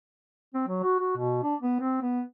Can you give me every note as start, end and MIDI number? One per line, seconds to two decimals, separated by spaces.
0.54 0.63 60
0.68 0.82 54
0.83 0.98 66
0.99 1.16 66
1.17 1.42 47
1.43 1.56 62
1.61 1.77 59
1.80 2.01 60
2.02 2.22 59